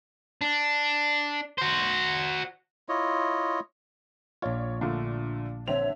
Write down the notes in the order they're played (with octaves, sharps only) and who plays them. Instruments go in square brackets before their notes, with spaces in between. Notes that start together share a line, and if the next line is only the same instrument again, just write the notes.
[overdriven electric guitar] D4
F#4 C5
[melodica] E4 F4 C#5 D#5
[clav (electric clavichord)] A#1 F4 [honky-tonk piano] C#5 D5
[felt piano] A#2 D3 A3 [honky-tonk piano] D4
[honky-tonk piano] D3 E5 F7 [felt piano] C4 [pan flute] C#5